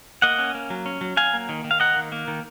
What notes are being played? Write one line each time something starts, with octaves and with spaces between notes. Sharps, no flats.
A#3 D#5 F#5
C#4
A#3
F#3
C#4
F#3
F#3 F5 G#5
A#3
D#3
D#3
F5
A#3 D#5 F#5
D#3
A#3
D#3